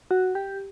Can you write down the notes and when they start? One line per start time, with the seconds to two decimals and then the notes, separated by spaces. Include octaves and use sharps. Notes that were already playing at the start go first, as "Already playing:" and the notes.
0.11 F#4
0.35 G4